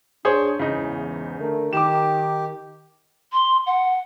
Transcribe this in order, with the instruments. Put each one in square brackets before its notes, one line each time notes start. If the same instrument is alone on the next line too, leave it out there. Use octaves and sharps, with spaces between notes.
[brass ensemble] G#2 D4 [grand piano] G#4 C5 C#5
[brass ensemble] E2 G#2 E3 [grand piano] C#3 D#4
[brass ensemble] D3 A3 A#4
[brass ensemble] D#3 [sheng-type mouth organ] G4 [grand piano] D6 E7
[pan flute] C6
F#5